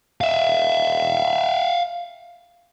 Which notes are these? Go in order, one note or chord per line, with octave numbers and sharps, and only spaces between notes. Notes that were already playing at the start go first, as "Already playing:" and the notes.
E5 F5